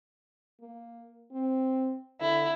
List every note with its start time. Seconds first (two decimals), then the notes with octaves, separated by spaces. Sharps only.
0.60 A#3
1.32 C4
2.21 D3 E4